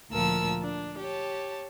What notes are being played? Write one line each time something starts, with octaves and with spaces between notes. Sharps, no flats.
D2 A#2 F3 A#4 A5 E6
D4
G4 C#5 A5